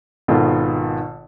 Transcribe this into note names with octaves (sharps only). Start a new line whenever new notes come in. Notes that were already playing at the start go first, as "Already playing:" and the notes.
G#1 B2 D#3 F4 A4